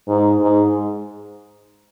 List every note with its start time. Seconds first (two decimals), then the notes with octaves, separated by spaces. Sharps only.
0.08 G#2
0.41 G#2